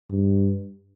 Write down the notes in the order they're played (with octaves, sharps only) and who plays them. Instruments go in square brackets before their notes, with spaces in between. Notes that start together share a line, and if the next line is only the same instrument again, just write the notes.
[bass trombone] G2